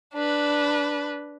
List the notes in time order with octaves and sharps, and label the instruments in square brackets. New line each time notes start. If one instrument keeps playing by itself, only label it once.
[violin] D4 B4